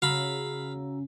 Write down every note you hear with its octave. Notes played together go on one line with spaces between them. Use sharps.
C#3 F#4 F5 A#5 B5 E6